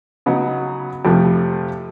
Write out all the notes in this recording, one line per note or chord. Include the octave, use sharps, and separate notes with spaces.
C#3 F#3 B3 D#4
F2 C3 F3 A3